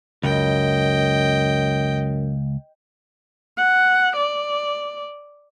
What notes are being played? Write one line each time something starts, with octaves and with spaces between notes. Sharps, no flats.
C#2 F#2 D#5 G5
F#5
D5